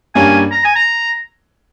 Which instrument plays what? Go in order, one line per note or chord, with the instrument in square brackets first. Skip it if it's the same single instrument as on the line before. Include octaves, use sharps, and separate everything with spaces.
[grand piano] G2 G3 A#3 C#4 [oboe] G#5
[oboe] A#5
G#5
A#5